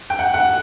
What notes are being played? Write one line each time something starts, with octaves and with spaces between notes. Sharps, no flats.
G5
F#5
F#5